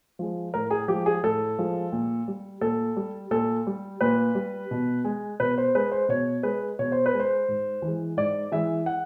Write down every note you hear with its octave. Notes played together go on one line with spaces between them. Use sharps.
F3 G#3
A2 A#4
G#4
F3 G#3 G4
G#4
A2 A4
F3 G#3
A#2
G3
A#2 A4
G3
A#2 A4
G3
A#2 B4
G3
B2
G#3
B2 B4
C5
G#3 B4
C5
B2 C#5
G#3 B4
B2 C#5
C5
B4
G#3
C5
G#2
E3 G#3
G#2 D5
E3 G#3 E5
F#5